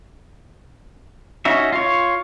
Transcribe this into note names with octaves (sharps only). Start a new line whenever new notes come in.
C#4 D#4 F#4 E5
F4 C#5